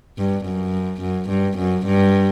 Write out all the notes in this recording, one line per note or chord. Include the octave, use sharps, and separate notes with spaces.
G2
F#2
F#2
G2
F#2
G2